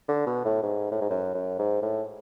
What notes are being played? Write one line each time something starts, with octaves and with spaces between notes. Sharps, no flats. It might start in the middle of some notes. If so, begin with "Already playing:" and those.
D3
B2
A2
G#2
A2
G#2
F#2
F#2
G#2
A2